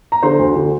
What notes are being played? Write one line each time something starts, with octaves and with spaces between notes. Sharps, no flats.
A#5
D3 C5 C6
D2
D3